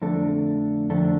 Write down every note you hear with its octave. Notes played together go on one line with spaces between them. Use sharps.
F2 D3 A3 D4 A4
F2 D3 A3 D4 A4